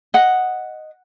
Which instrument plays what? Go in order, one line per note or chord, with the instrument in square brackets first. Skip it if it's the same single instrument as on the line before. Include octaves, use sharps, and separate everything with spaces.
[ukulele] D#5 F#5